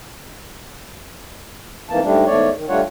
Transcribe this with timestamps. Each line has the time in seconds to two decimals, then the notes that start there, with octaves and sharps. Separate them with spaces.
1.90 F2 G#2 E3 A#3 A5
2.04 G#2 G3 A3 D4
2.26 E2 G#2 A3 C#5 D5
2.55 D#3
2.69 G3 A3 D4 F4 C#5 F#5